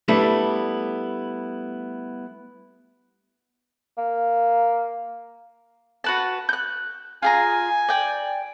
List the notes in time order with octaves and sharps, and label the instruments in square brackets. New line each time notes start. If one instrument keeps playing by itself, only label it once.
[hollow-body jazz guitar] G3 A3 B3 D4 E4
[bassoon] A#3
[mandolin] F#4 B4 A5
F#6 G6
[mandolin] F4 G#4 A#5 [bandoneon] G#5
[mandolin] D5 G5